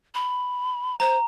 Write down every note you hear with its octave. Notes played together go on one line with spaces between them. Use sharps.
B5
C5 A#5